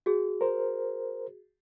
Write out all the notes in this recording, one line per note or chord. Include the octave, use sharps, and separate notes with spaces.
F#4 G#4
A#4 C5